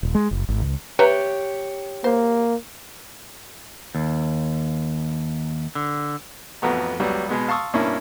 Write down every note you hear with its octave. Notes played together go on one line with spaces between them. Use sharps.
D#1
G#3
F#1
G#1
C#2
G4 B4 C#5 E5 A#5
A#3 C5
D#2
D3
A1 F2 B3 F#4 A#5
C#2 F#3 G3 B3
B2 G#3 B3
F5 A5 C6 C#6 D#6 E6
G2 B2 A#3 C#4 D4 E4